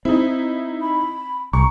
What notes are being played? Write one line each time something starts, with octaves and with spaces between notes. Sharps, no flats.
C4 D#4 E4
B5
C2 A#5 C#6